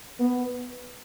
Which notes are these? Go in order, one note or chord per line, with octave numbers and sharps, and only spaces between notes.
B3